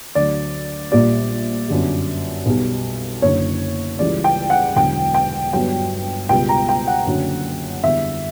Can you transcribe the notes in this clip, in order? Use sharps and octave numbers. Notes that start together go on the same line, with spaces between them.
D2 D3 F#3 D5
A#1 A#2 G3 D5
G1 F#2 D3 G3
B1 B2 G3
F#1 F#2 D3 C#5
C#2 C#3 E3 G3 D5
G5
F#5
E1 E2 D3 F#3 G5
G5
G1 G2 F#3 G5
C#2 B2 G3 G5
A#5
G5
F#5
F#1 F#2 D3 F#3
E2 D3 G3 E5